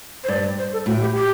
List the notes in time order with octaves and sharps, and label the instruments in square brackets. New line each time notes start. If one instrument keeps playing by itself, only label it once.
[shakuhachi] C5
[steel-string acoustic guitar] G2 [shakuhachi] D5
[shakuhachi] C5
A4
[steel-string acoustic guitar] A2 [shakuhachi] F#4
[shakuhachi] G4
G4